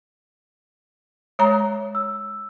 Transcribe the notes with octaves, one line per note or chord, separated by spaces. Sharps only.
G#3 C#5 A#5
E6